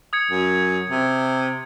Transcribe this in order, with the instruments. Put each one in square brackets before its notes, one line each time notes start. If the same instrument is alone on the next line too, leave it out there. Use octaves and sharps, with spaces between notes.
[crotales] D#6 G#6 C#7
[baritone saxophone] F#2
C3